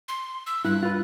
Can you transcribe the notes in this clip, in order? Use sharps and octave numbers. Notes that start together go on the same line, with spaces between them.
C6
E6
G2 E4 F#6
F4 B4